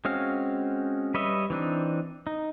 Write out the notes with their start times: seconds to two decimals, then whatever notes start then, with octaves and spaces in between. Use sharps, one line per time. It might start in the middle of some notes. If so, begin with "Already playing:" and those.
0.05 G#3 C4 C#4 F#4 F5
1.14 G3 B4 C#5 D#5 E5
1.50 E3 C4 D4 D#4
2.27 D#4